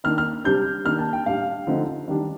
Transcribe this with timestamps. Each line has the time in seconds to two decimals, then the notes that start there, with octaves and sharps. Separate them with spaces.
0.04 D#3 A#3 D4 F6
0.18 F6
0.44 C3 G3 D4 G6
0.85 D#3 A#3 D4 F6
0.99 A5
1.13 G5
1.26 A2 G3 D4 F5
1.67 D3 F3 A3 C4 D#4
2.08 D#3 G3 D4